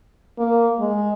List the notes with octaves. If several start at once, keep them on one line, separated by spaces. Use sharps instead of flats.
A#3
G#3